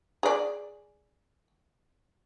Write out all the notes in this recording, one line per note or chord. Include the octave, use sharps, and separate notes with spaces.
G#4 D5